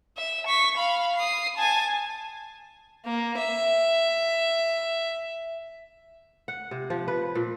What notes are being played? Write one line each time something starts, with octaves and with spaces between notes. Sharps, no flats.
E5
C#6 B6
F5 B5
D#6 C7
G#5 A5
A#3
E5
F#5
C3
F3
B4
A#2